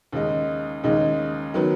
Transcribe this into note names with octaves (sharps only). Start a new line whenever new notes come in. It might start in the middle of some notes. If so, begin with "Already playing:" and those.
D#2 C#3 G#3 D#4
D#2 C#3 G#3 D#4
D#3 F#3 B3